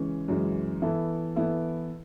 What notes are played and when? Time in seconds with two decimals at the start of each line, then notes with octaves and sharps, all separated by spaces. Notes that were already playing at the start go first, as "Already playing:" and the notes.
Already playing: C#3 E3 G#3 C#4
0.28 F#2 C#3 E3 G#3 C#4
0.82 E3 B3 E4 A4
1.36 E3 B3 E4 A4